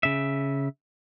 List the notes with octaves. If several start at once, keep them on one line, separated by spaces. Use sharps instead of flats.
C#3 E5